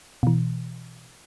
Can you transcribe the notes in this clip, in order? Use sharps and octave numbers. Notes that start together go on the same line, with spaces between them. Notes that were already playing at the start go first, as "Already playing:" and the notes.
B2 E3